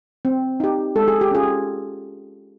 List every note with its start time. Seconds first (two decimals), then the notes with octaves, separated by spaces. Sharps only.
0.25 C4
0.60 D#4 G4
0.96 G#3 A4
1.08 G#4
1.21 G4
1.31 C#4 F4 G#4